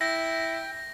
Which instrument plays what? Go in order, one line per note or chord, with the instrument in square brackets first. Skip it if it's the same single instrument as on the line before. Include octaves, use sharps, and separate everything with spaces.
[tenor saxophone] E4 [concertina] G5 [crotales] A#6